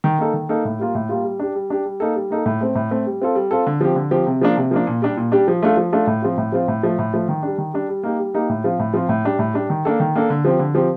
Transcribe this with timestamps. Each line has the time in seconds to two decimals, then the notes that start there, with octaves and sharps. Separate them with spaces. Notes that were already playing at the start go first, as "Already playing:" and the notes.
0.04 D#3
0.19 A#3 D#4 A4
0.34 D#3
0.49 A#3 D#4 A4
0.65 A2
0.79 G3 A#3 F4
0.95 A2
1.09 G3 A#3 F4
1.24 G3
1.39 D4 G4
1.55 G3
1.70 D4 G4
1.85 G3
2.00 A#3 D#4 A4
2.15 G3
2.30 A#3 D#4 A4
2.46 A2
2.61 A3 C4
2.75 A2
2.91 A3 C4
3.06 G3
3.21 C4 F4 A4
3.35 G3
3.51 C4 F4 A4
3.67 D3
3.81 F3 C4 G4
3.96 D3
4.11 F3 C4 G4
4.27 C3
4.41 F3 A#3 D4
4.57 C3
4.71 F3 A#3 D4
4.87 A#2
5.02 G3 D4 G4
5.17 A#2
5.32 G3 D4 G4
5.48 F3
5.62 A3 D4 F4 A4
5.77 F3
5.92 A3 D4 F4 A4
6.07 A2
6.22 F3 C4 F4
6.37 A2
6.52 F3 C4 F4
6.68 A2
6.83 F3 A3
6.98 A2
7.14 F3 A3
7.29 D#3
7.43 G3 D4
7.58 D#3
7.74 G3 D4
7.89 G3
8.03 A#3 D#4 G4
8.19 G3
8.34 A#3 D#4 G4
8.49 A2
8.64 F3 C4 F4
8.79 A2
8.94 F3 C4 F4
9.09 A2
9.25 G3 D4 G4
9.39 A2
9.54 G3 D4 G4
9.70 D#3
9.85 A#3 D4 A4
10.00 D#3
10.15 A#3 D4 A4
10.30 D3
10.45 F3 C4 G4
10.59 D3
10.75 F3 C4 G4